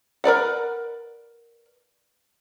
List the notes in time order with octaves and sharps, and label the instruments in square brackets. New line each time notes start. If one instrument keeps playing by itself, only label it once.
[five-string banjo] A#4 B4 D5 F#5